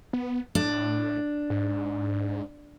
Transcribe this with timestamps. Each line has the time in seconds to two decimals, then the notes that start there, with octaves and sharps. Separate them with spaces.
0.13 B3
0.55 A2 D4
1.50 G#2